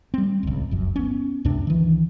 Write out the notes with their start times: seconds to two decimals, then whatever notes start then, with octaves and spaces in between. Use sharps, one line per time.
0.14 G3 C4
0.43 D1 C#2
0.71 F1 F#2
0.96 B3 C#4
1.45 C#2 F#2 C3 D4
1.67 D#3 E3